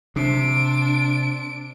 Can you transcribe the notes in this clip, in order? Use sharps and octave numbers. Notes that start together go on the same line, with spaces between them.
C3 D4 D7